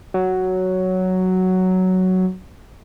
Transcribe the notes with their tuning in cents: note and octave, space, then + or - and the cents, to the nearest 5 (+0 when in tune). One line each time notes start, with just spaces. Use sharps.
F#3 +5